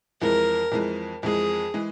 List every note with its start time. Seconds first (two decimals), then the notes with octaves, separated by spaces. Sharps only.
0.21 F2 E3 G#3 A#4
0.72 F2 E3 G#3
1.23 F2 E3 G#3 G#4
1.74 E3 G#3